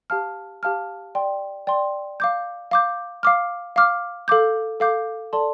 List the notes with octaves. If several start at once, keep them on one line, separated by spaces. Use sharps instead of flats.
G4 F5 A5 F6
G4 F5 A5 F6
D5 G5 C6
D5 G5 C6
F5 D6 G6
F5 D6 G6
F5 D6 F6
F5 D6 F6
A4 F5 D6 G6
A4 F5 D6 G6
A4 D5 A5 C6